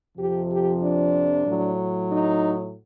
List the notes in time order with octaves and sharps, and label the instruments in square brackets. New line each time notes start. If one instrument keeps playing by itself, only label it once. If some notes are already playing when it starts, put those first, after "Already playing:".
[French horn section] F2 C3 F3 G4
G4
D4
A2 F#3
D#4